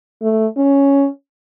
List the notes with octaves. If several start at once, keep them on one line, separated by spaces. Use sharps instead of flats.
A3
C#4